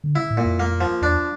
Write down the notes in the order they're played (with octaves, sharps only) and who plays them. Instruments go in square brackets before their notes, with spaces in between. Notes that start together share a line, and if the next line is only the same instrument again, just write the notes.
[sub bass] D3
[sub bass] C#3 [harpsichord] E4
[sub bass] A2
[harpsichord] A#2
[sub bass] F2
[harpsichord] A#3
F3
[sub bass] E2 [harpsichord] D4